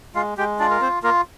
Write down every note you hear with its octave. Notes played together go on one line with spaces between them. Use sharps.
G#3 F4 F5
G#3 G4 G5
D4 F4 D5
A#4
C4 C5
A#3 F4 A#4